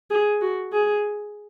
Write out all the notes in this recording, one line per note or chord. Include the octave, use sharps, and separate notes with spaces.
G#4
F#4
G#4